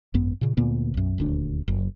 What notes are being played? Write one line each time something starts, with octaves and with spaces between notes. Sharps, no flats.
G#1 F#2 B3
A#2 C#3
D2 A#2 A#3 B3
B1 F#2
D#1 D2 D4
F#1 F#2